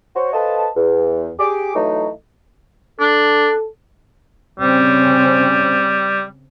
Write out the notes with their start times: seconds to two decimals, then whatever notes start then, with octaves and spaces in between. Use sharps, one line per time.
0.16 F#4 C5 C#5
0.33 A4 B4 C5 D#5 F5 A5
0.76 E2
1.40 G4 G#4 D6
1.75 E3 F#3 A3 D#4
3.00 D4 A4
4.60 C#3 G3 C4 C#4